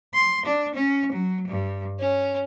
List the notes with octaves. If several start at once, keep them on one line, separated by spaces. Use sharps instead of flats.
C6
D4
C#4
F#3
G2
C#4